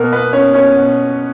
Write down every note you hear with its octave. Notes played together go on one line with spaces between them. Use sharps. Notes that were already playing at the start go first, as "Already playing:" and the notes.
Already playing: B2 A#3 A#4
B3 B4
C#4 C#5
C#4 C#5
B2